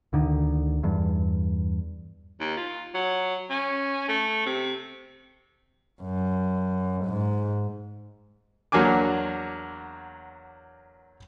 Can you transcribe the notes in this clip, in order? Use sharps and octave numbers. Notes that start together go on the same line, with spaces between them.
D2 D3 D#3
E2 G2
D#2
F4
F#3
C#4
A3
C3
F#2
G#2
E2 F#3 A#3 D4 G#5 D6